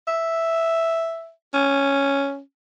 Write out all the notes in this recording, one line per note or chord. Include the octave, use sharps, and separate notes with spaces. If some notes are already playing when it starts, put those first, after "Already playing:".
E5
C#4